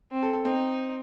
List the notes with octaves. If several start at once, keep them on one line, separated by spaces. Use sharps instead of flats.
C4
A4
A4
C4 D#4